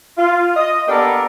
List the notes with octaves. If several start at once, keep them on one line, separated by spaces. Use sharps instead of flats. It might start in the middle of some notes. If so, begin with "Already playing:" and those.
F4
D#5
A#3 B3 D4 G4 A4 A#4